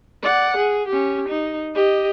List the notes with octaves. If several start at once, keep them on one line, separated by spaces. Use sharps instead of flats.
D5 F#5
G#4
C#4 G4
D#4
G4 D#5